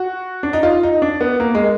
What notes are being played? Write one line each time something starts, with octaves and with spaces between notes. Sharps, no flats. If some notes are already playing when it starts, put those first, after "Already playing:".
Already playing: F#4
D4
D#4
F4
D#4
D4
B3
A#3
G#3